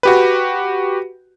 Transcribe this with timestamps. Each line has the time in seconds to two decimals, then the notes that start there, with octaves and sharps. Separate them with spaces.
0.03 F#4 G4 B4